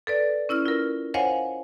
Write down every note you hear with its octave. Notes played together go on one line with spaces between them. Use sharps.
A4 B4 D5
C#4 E4 E6 F6
F4 A#4
C5 C#5 D#5 F5 F#5 G#5